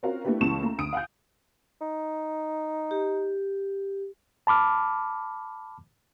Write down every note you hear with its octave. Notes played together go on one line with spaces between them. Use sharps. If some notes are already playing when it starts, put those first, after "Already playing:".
C4 C#4 F4 F#4 A#4 F5
A3 B3 D4 E4 G4 B4
C#2 E3 G#3 A5 C#6 E7
A3 A#5
D2 D#6 D7
F5 F#5 G#5 G6
D#4
G4
A5 B5 D6 F6